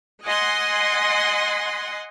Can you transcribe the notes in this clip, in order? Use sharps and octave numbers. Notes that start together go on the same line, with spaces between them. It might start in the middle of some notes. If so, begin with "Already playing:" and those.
D#5 F#5 G#5 C6